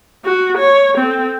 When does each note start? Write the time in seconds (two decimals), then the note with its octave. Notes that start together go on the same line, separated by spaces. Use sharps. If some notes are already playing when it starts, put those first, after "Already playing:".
0.24 F#4
0.58 C#5
0.98 C4 A4